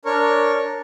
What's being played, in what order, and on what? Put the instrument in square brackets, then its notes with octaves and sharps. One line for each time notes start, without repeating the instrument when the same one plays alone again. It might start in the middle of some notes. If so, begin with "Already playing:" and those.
[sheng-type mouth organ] D4 A#4 C#5 C#6